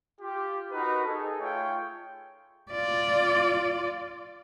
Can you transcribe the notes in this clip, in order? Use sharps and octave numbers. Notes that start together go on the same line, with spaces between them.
F4 G4
D#4 F#4 A#4 B4
D#4 G#4 A4
A3 F4 G#4 C#5 G5
F4 D5